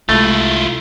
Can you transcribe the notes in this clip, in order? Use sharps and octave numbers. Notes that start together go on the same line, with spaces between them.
C2 G#3 A3 E4 F4